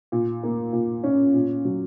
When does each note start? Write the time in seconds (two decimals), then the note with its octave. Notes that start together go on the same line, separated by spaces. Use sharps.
0.12 A#2
0.43 A#3
0.73 A#2
1.03 C#4
1.34 A#2
1.65 F#3